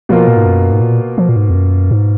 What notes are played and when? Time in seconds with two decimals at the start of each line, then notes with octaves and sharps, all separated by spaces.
0.09 B2 F3 A#3 F4 A#4
0.28 A#2
0.36 G#2
0.46 F#2
0.72 G#2
0.81 A#2
1.18 F3
1.29 A#2
1.36 G#2
1.50 F2
1.55 F#2
1.91 G#2